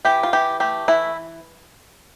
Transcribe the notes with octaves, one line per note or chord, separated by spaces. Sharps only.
E3 G4
F4
E3 G4
A3 G4
E3 E4